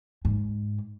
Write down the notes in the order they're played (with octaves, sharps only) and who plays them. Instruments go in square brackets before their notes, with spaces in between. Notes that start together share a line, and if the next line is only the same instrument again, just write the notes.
[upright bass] G#2